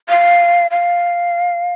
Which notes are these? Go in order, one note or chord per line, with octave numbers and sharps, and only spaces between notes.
F5
F5